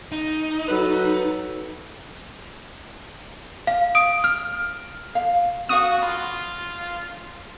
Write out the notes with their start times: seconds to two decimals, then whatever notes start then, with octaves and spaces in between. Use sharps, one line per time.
0.12 D#4
0.68 F#3 A4 B4
3.67 F5
3.95 D#6 D7
4.24 F6
5.15 F5
5.69 C#4 F#4 F5 D#6
6.02 F4 B5